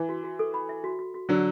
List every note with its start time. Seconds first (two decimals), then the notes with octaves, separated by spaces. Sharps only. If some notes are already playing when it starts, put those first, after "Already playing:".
Already playing: E3
0.09 F#4
0.24 F#4
0.39 A4
0.54 B5
0.69 E5
0.84 F#4
0.99 F#4
1.14 F#4
1.29 D3 F#3 D5